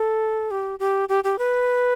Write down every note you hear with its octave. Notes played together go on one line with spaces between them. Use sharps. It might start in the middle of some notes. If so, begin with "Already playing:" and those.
Already playing: A4
G4
G4
G4
G4
B4